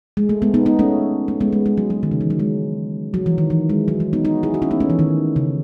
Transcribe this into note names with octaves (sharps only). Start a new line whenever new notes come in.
G#3
A3
G#3 B3
B3 D#4
B3 D#4
A3 C#4
A3
G#3 B3
G#3
G#3
F#3
F#3
D#3
C#3
E3
F#3
G#3
F#3
E3
D#3
E3
G#3
F#3
F#3
B3 D#4
D#4 F#4
E4 G#4
F#4
C#4 E4
B3 D#4
A3 C#4
E3
D#3
C#3